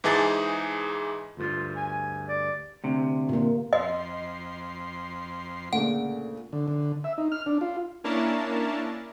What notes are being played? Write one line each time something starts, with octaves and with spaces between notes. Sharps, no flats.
G#2 E3 D#4 G#4 A5 A6
D2 G2 F4
G#5
D5
D2 C3
A#2 A#3
F2 D#5 C6
D2 A#2 C#3 F#5
D3
D3
E5
D#4
F6
D4
F4
A#3 C#4 D4 E4 A#4 A5